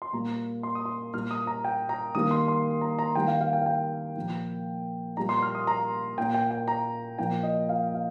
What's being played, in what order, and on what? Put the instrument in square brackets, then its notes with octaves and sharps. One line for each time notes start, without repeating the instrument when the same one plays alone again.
[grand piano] C6
A#2 G3 A#3 A#5
C6
D#6
C6
A#2 G3 A#3 F6
D#6
A#5
G5
A#5
D#3 G3 A#3 D#6
C6
C6
A#5
A#5
D#3 G3 A#3 G5
F5
F5
G5
F5
G5
A#2 F3 A#3
A#2 G3 A#3 A#5
C6
F6
D#6
A#5
A#2 A#3 G5
G5
G5
A#5
A#2 F3 A#3 G5
D#5
F5
F5